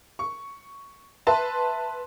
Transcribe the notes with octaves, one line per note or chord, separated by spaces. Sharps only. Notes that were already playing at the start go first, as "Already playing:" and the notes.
C#6
B4 E5 A5 C6